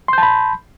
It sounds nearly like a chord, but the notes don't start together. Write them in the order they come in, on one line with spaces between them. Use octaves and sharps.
C6 G6 A5 B5